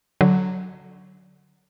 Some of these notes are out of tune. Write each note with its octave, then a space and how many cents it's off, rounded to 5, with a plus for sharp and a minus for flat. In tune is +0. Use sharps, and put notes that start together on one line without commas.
D3 +0 F#3 +0